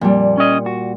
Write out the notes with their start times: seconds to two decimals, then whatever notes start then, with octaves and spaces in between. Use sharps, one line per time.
0.01 F2 A#2 G3
0.38 C#4 D#5
0.66 F#4